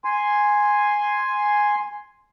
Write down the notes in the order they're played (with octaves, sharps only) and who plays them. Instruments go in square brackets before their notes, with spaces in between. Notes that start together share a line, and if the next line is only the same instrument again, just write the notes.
[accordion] G#5 C6